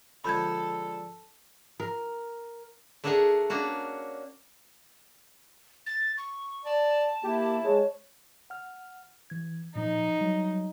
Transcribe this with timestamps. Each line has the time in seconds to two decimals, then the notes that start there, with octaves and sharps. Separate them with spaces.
0.24 D3 F3 G#3 A4 B5 G6 G#6
1.80 A#4
3.04 A3 D4 G#4 A#4 F#5 G#5
3.50 A#3 C#4 D4 F#4
5.86 A6
6.18 C#6
6.65 D5 A5
7.23 A#3 E4 G4
7.64 G#3 C#5
8.50 F#5 F6
9.30 E3 G#6
9.76 A#2 F3 D#4
10.21 F#3 G3